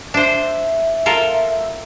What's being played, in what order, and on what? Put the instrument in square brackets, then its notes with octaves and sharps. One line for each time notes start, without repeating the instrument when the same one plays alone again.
[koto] D4 C5 [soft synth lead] E5
[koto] F4 A4 A#4